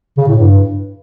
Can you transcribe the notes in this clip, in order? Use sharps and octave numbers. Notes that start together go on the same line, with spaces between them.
C#3
A2
G2